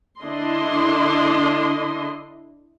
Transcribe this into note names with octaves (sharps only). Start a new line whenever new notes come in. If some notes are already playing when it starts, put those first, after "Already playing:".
D3 D4 E4 D#5 C6